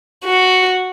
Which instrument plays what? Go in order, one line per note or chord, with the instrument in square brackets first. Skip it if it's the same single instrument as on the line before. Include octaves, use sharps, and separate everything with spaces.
[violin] F#4